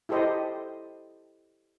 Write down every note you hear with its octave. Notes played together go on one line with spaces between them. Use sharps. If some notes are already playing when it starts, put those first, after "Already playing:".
E4 G4 A4 C5 D#5